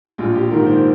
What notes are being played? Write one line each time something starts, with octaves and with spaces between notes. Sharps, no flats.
A#1 F4
G4
G#2 D#3 A#3 A#4
C5